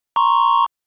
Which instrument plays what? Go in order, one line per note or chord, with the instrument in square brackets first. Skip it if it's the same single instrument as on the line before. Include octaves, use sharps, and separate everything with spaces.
[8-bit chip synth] A#5 C6 C#6